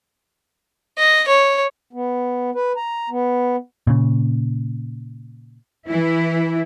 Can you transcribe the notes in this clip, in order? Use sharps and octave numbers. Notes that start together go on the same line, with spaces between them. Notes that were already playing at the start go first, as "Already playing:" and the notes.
D#5
C#5
B3
B4
A#5
B3
A#2 C#3
E3 E4